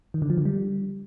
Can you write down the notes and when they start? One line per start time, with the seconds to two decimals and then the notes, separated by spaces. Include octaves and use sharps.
0.14 D#3
0.22 D3
0.30 F3
0.38 D3
0.45 G3